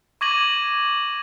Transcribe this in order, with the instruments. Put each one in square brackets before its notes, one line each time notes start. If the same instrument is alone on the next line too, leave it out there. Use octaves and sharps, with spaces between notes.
[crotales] C#6 D6 G#6 A#6 D#7 F#7